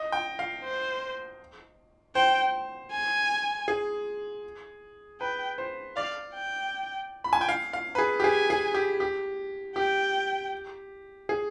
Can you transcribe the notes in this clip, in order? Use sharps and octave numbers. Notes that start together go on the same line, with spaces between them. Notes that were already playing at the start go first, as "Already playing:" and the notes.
Already playing: D#5
G5
F5
C5
C5 G5
G#5
G#4
B4 G5
C5
D5 F5
G5
B5
G#5
G5
F5
F5
B4
G#4
G4
G#4 G#5
G#4
G4
G4
G4 G5
G#4